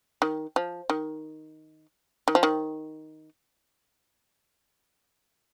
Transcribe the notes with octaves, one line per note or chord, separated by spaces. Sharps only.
D#3
F3
D#3
D#3
F3
D#3